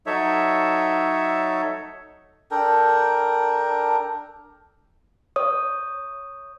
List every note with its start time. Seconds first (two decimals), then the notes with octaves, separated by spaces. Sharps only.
0.06 F#3 D#4 A4 C#5 E5
2.51 D4 A4 A#4 G5
5.36 C#5 D#6